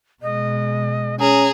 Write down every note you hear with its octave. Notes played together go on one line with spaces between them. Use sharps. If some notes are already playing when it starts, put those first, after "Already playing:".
B2 G#3 D#5
C#4 G#4 A#5